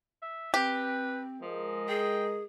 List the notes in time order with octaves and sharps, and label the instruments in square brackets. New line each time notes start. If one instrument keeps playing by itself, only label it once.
[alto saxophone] E5
[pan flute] C4 [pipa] G4 [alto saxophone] B4
[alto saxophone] F3 [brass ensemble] G#3 A#4 D#5
[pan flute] G#4 [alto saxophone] G5